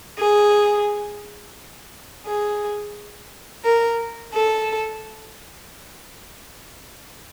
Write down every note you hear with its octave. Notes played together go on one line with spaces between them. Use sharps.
G#4
G#4
A#4
A4